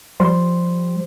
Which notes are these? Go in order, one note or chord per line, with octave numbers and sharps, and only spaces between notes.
F3 G3 C5 C6